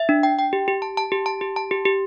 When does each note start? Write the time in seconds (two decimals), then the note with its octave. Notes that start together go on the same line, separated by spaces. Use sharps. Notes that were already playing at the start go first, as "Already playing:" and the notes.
Already playing: E5
0.09 D4
0.23 G5
0.39 G5
0.53 G4
0.68 G4
0.82 A5
0.97 A5
1.12 G4
1.26 A5
1.41 G4
1.56 A5
1.71 G4
1.85 G4